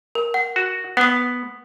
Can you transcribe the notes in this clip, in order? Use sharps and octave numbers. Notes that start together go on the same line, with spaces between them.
A#4
F#5
F#4
B3 F#5 D#6